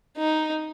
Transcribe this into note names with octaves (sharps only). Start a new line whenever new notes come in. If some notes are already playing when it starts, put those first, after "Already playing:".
D#4